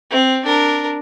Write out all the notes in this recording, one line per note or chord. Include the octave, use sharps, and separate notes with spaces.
C4
D4 A#4